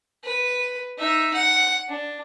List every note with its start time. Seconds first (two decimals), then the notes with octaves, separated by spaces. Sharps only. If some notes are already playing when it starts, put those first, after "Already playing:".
0.24 B4
0.98 D#4 E5
1.33 F#5
1.88 D4